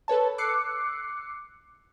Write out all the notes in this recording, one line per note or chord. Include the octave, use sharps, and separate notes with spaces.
A4 B4 C#5 A5
D6 E6 F#6 C7 C#7